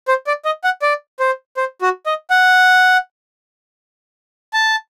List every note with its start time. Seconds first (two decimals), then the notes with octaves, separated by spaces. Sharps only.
0.08 C5
0.27 D5
0.45 D#5
0.64 F#5
0.82 D5
1.20 C5
1.57 C5
1.82 F#4
2.06 D#5
2.30 F#5
4.54 A5